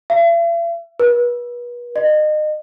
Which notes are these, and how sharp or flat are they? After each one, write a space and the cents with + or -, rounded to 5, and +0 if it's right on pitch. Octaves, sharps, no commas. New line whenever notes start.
E5 +45
B4 -35
D#5 -30